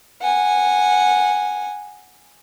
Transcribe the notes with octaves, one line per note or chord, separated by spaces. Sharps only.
F#5 G#5